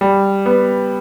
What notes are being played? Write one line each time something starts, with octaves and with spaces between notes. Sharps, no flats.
G3
B3